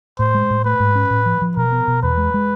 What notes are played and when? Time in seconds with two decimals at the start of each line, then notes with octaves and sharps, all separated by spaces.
0.19 A2 C5
0.35 G#3
0.50 A2
0.65 A3 B4
0.80 G#2
0.95 C#4
1.10 A2
1.26 F3
1.42 F3
1.57 B2 A#4
1.72 B3
1.88 B2
2.03 E2 B4
2.18 G#3
2.34 G#3